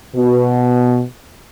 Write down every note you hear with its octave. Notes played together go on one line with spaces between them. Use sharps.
B2